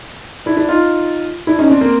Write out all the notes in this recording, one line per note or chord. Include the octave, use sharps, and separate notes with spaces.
D4 E4
D4 E4
D#4 F4
D4 E4
C#4 D#4
C4 D4
A#3 C4